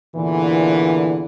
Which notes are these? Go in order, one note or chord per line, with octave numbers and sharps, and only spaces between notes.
E2 A#2 D3 E3